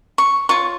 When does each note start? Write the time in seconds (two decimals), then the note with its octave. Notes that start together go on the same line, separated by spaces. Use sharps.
0.18 C#6
0.49 F4 C#5 C#6